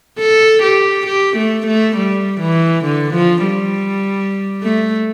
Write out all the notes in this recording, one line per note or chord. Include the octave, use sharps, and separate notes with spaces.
A4
G4
G4
A3
A3
G3
E3
D3
F3
G3
A3